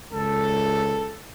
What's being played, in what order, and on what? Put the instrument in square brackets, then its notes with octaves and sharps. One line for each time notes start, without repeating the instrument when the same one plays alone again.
[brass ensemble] C#2 A4